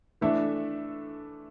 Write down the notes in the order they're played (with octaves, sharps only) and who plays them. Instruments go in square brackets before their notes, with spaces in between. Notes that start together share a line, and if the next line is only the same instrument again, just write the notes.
[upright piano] E3 A3 D4 A4 E5